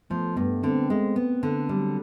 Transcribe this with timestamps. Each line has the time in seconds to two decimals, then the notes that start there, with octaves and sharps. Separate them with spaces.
0.10 F3 A3 B3
0.37 G2 A3 B3
0.63 D3 A#3 C4
0.90 G#3
1.16 B3
1.43 D3
1.69 F#3 G3